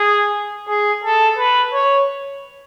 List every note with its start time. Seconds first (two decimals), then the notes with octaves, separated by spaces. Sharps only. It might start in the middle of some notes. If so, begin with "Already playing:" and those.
Already playing: G#4
0.68 G#4
1.04 A4
1.38 B4
1.73 C#5